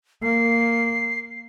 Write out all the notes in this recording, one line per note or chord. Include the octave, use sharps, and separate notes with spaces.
A#3 C7